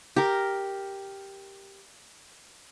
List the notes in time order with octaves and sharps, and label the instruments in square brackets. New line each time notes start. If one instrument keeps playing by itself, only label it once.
[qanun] G4 A#4